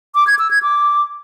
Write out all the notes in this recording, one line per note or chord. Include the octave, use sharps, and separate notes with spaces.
D6
G#6
E6
G#6
D6